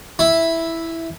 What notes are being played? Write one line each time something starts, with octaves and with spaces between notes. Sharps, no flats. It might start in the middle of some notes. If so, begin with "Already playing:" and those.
E4